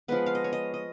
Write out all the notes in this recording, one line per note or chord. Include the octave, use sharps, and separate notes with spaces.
F3 G#3 B3 B4
F5
D#5
C#5
D#5
D#5